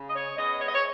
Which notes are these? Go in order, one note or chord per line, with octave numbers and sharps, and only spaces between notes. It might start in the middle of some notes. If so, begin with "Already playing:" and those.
Already playing: C#3
D#5
C#5
G#3 B3 D#5
C#5
D#5
C#5